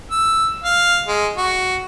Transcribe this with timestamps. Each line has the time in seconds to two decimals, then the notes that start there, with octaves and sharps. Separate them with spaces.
0.11 E6
0.64 F5
1.07 G#3
1.37 F#4